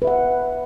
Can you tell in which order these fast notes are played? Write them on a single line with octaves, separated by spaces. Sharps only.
B4 E5 F#5